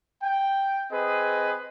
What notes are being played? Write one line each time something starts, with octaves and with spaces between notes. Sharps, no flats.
G5
C4 G#4 B4 D#5